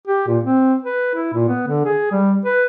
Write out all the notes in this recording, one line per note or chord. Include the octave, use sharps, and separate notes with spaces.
G4
A#2
C4
B4
E4
A#2
B3
D3
G#4
G3
B4